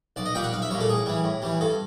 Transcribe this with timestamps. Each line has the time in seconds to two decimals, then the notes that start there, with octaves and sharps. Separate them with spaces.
0.16 B1 D5
0.26 D#5
0.35 A#2 G3 G5
0.44 F#5
0.53 B1 F5
0.62 E5
0.70 G3 C#5
0.74 A#2
0.80 A4
0.89 A2 G#4
1.06 E3 G3
1.24 A2
1.42 E3 G3
1.60 G2 A4